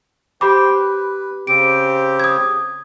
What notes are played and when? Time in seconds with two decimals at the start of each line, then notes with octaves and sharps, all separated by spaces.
0.41 G4 C5 G5 B5 D6
0.74 B4
1.47 C#3 C4 G4 D7
2.20 D#6 G#6